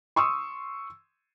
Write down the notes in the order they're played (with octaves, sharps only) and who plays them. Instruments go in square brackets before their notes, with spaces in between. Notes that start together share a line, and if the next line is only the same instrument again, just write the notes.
[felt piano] C6 C#6 D#6 E6